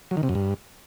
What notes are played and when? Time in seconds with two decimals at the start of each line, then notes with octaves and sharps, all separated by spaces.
0.11 F#3
0.17 D#3
0.23 C3
0.29 F#2
0.35 G2